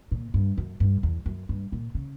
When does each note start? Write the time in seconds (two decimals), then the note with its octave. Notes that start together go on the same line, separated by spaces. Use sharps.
0.11 A#2
0.34 G2
0.58 F#2
0.80 G2
1.03 E2
1.26 F#2
1.49 G2
1.72 A#2
1.95 C#3